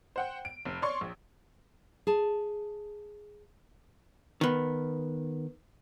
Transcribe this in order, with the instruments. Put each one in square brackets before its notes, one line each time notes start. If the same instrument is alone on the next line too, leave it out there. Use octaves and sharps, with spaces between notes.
[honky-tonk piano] C5 F#5 G5
D7
F1
C#5 D5 C6 C#6
A#1
[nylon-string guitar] G#4 A5
[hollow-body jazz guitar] D#3 B3